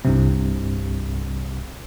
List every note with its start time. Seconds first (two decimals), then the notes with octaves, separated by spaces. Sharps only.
0.05 C2 G2 C3